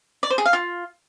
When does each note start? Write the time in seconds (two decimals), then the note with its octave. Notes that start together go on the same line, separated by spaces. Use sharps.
0.23 D5
0.30 C5
0.38 G#4
0.46 F5
0.53 F4